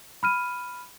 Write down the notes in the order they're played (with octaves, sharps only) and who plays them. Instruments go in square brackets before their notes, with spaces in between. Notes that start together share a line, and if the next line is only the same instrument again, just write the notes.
[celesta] B5 F6 D#7